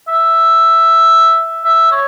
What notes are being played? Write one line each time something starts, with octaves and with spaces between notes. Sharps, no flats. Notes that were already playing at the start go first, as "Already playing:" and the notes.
E5
E5
C#5